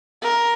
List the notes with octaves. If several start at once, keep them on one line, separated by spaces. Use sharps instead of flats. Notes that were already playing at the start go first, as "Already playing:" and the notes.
A#4